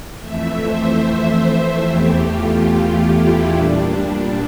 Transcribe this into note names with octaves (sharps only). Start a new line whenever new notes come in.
F2 E3 A3 E5
C5
E5
E2 E3 A3 G4
F4
E4
A#2 G3 D4